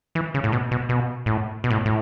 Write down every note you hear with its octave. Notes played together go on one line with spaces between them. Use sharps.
E3
C#3
A2
B2
B2
B2
A2
B2
A2
A2